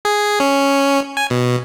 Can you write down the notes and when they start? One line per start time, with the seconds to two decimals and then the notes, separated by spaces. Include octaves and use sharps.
0.05 G#4
0.40 C#4
1.17 G#5
1.30 B2